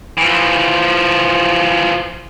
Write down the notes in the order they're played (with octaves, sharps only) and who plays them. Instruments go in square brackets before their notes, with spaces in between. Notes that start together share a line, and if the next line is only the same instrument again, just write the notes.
[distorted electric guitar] E3 F3